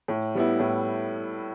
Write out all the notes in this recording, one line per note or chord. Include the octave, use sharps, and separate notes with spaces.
A2
G3 B3 E4
A2